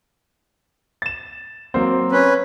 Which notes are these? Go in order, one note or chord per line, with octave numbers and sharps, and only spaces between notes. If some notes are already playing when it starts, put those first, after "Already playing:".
A6 E7
F#3 A#3 C4
C#4 B4